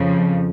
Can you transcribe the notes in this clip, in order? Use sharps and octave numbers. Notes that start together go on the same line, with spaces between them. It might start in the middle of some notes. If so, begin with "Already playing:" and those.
Already playing: F2 C#3 F3